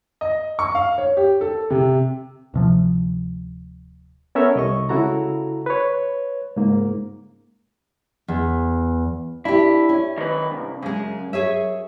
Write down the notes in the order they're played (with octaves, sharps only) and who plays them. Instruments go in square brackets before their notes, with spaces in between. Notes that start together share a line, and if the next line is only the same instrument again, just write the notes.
[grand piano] D#5
C#6
F5
C#5
G4
A4
C3
[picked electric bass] D1 C3 F3
[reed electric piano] B3 C#4 A4 A#4 C#5 E5
C2 D#5 C#6
C#2 C#3 E4 F#4 A4 A#5
B4 C#5
C#2 G#2 A#3
[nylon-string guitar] E2
[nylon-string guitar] D4 G4 [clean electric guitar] E4
[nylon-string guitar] C#4
[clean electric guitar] D#3 B4
C2 G2
[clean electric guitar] F#2 [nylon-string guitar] C#3 G#3
[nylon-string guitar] G#4 C#5 E5